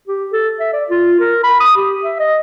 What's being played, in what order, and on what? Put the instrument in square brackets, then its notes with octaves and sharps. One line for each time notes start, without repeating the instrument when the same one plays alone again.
[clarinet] G4
A4
E5
D5
F4
A#4
B5
D#6
G4
E5
D#5